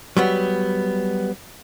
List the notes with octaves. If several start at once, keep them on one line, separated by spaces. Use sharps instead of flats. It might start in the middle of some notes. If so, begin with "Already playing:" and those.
F#3 G3 B3